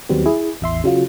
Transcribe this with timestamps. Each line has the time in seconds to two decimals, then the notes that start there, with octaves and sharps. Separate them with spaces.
0.09 D#2 F#3 G3 B3 C4
0.26 E4 G#4
0.61 A1 E2 E5 C6
0.84 C#3 F#3 F4